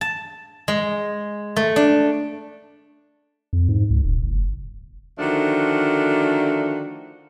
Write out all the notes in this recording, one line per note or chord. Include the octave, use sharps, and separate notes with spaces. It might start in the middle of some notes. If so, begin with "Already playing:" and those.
A5
G#3
A3
D4
F2
G#2
C#2
D#1
F#1
D3 D#3 F3 A3 D4 F#4